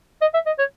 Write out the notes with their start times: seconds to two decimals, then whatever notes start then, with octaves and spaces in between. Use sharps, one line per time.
0.21 D#5
0.34 E5
0.46 D#5
0.59 C#5